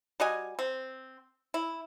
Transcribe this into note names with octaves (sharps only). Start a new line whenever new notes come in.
G3 F#4 D#5 G#5
C4
E4